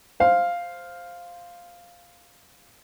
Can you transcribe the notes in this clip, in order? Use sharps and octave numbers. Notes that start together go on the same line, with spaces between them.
C5 F5